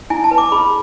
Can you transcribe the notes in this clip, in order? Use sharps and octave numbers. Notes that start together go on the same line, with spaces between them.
E4 G#5
A5
B4
D6
G#4 B5